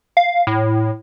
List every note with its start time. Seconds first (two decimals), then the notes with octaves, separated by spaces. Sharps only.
0.17 F5
0.47 A2